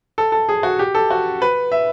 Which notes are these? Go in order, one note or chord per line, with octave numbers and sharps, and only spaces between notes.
A4
A4
G#4
F#4
G4
A4
F#4
B4
E5